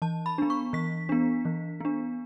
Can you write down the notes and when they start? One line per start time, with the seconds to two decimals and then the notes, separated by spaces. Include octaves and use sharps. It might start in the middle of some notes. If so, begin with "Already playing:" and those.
0.02 E3 A5
0.26 B5
0.38 B3 D4
0.50 C#6
0.73 E3 B6
1.09 B3 D4
1.45 E3
1.80 B3 D4